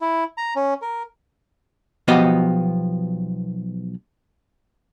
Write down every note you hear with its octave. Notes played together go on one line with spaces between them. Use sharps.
E4
A#5
C#4
A#4
B1 F3 B3 F#4 G4 D#5